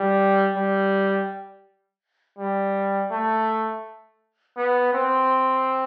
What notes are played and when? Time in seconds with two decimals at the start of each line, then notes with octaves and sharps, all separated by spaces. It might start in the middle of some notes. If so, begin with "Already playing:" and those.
Already playing: G3
0.56 G3
2.39 G3
3.11 A3
4.57 B3
4.94 C4